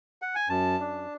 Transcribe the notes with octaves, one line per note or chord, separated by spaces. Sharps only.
F#5
G#5
F#2 A5
D4